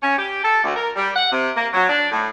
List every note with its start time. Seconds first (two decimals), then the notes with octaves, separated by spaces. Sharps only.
0.03 C#4
0.18 G4
0.44 A4
0.64 D2
0.76 A#4
0.96 G3
1.16 F#5
1.32 C3
1.56 A#3
1.73 F#3
1.89 D4
2.11 A2